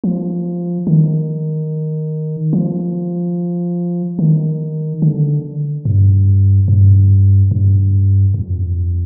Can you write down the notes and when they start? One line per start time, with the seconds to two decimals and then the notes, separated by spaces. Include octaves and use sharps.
0.04 F3
0.87 D#3
2.53 F3
4.19 D#3
5.02 D3
5.85 G2
6.68 G2
7.51 G2
8.34 F2